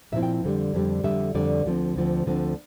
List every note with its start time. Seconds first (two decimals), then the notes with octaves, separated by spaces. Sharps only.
0.12 A#2 F3 C4 E4 E5
0.23 G5
0.44 F2 D3 G3
0.74 F2 D3 G3
1.04 F2 D3 G3 E5
1.35 F2 D3 G3 D5
1.66 D2 D3 F3 C4
1.96 D2 D3 F3 C4
2.26 D2 D3 F3 C4